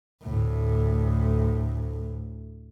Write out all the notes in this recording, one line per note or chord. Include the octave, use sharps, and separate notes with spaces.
D2 A2